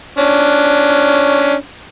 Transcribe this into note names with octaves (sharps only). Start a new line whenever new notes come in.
C#4 D4